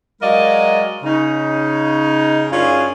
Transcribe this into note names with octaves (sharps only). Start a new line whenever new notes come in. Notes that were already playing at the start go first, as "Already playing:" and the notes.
F#3 G#3 A#4 D5 D#5 F5
C#3 D#4
F#2 C#4 D4 F4 G#4 F5